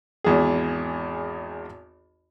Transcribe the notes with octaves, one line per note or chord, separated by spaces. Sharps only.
G#1 E2 G#4